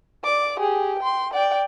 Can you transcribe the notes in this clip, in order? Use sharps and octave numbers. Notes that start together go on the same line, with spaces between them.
D5 D6
G4 G#4
G5 C6
D5 G5